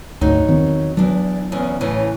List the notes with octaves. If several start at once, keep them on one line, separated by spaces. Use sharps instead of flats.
D2 G#2 F#3 D#4
E2 D#3 C4
E2 F#3 D4
E2 C#3
A2 C#3 E3